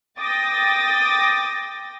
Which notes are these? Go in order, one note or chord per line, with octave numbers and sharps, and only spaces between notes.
G5 D6 D#6 A6 A#6